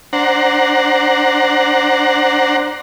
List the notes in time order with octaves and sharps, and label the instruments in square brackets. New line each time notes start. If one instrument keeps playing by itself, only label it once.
[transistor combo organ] D4 C5 F#5 A#5